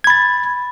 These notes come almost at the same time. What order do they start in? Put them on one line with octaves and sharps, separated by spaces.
G#6 B5 A6